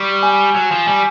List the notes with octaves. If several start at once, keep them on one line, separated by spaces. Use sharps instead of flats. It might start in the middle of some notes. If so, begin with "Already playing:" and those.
Already playing: G3 C#6
G#5
F#3 E6
F3
G3 G#5